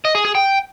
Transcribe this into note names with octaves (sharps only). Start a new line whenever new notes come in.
D#5
G#4
G#4
G5